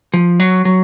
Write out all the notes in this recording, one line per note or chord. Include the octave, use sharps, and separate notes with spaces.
F3
F#3
F#3